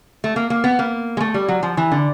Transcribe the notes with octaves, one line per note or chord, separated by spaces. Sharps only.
A3
A#3
A#3
B3
A#3
G#3
A3
G3
F#3
F3
E3
D3